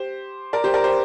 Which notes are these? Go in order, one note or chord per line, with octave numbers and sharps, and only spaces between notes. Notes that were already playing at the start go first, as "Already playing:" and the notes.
Already playing: G4 C5
A#4 D5
G4 C5
A#4 D5
G4 C5